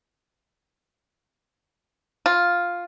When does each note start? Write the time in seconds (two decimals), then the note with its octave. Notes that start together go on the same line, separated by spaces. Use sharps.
2.26 F4